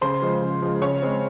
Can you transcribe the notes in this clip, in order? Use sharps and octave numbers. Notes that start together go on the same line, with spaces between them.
C#3 C5 C6
F3 G#3
C#3
F3 G#3
C#3 C#5 C#6
G#3 C4